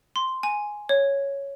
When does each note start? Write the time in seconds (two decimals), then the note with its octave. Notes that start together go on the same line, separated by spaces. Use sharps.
0.16 C6
0.43 G#5
0.89 C#5